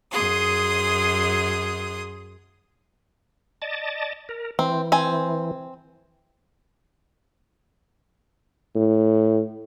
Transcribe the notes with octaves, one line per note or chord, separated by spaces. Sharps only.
F#2 G#4 C6 D#6
D5 D#5 A5
A#4
E3 C4
C4 G#5
A2